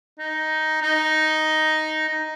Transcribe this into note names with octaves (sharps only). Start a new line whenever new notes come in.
D#4
D#4
D#4